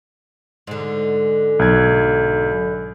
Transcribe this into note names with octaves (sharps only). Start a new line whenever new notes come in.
G#2 D3
B1 G#6